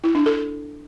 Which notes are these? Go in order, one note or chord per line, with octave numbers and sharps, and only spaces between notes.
E4
D4
A4